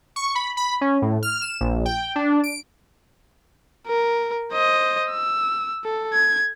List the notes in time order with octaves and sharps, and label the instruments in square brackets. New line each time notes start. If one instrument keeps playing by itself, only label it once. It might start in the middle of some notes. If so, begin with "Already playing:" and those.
[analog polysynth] C#6
B5
B5
C#4
A2
F6
E7
A#1
G5
D4
D7
[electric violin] A#4
C5 D#5
E6
A4
G#6